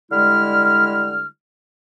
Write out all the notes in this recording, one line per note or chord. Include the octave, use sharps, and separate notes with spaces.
D3 G3 G#3 E4 F6